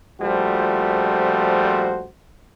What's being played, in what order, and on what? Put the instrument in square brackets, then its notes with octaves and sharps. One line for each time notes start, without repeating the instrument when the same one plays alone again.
[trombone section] A#1 F3 G3 A3 F#4 C5